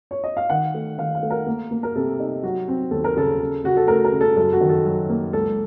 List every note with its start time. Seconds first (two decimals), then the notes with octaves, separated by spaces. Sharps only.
0.11 C#5
0.24 D#5
0.37 F5
0.49 D#3 F#5
0.74 A3
0.98 D#3 F5
1.15 F5
1.23 A3
1.30 A#4
1.46 A#3
1.71 A#3
1.83 A#4
1.96 C3 A4
2.20 D#4
2.43 F#3 F#4
2.68 C4
2.91 D#2 A4
3.04 A#4
3.16 C#3 A4
3.41 C#3
3.64 C#3 F#4
3.77 A4
3.88 A3 A#4
4.05 A#4
4.12 C#3
4.21 A4
4.36 F#2 A4
4.53 F#4
4.61 D#3
4.69 A4
4.85 F#3
5.09 A#3
5.33 C#2 A4